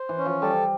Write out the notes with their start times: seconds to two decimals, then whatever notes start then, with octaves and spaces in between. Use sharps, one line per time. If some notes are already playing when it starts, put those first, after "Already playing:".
Already playing: C5
0.09 E3
0.18 C#4
0.26 F3
0.42 G3 A4